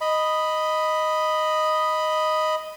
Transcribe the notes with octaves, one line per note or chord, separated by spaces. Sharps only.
D#5 B5